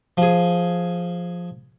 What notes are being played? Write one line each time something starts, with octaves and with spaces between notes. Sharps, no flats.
F3 G#4